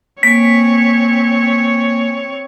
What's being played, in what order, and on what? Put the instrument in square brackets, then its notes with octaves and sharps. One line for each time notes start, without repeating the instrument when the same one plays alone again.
[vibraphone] A#3 G#5 [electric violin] C4 C#5 [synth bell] B6